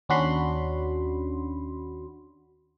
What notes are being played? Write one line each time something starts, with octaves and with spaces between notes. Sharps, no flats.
D#2 C#4 D4 F#4 B5 C6